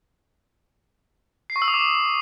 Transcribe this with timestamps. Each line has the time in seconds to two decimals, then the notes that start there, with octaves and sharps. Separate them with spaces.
1.50 C7
1.56 C#6
1.62 E6
1.68 D#6
1.74 D6